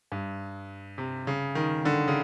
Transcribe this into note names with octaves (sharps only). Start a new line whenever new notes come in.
G2
C3
C#3
D#3
D3
C#3